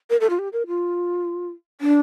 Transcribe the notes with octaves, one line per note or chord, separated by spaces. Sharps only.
A#4
A4
F4
G4
A#4
F4
D4